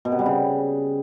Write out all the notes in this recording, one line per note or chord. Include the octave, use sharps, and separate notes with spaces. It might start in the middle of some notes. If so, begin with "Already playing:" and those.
B2
C3
G3
C#3